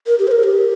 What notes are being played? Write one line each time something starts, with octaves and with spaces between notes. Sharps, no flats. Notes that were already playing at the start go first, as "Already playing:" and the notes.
A#4
G4
C5
A#4
G4